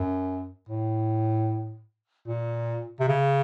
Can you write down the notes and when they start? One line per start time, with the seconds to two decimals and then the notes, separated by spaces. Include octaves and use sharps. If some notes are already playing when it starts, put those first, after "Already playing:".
Already playing: F#2
0.69 A2
2.28 A#2
3.00 C3
3.08 C#3